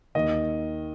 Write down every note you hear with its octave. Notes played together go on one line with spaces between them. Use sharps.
D#2 D#3 D#5